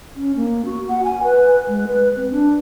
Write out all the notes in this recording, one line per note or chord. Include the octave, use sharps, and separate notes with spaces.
C#4
A#3
F#4
F#5
G#5
B4
G#3
B4
C4
D4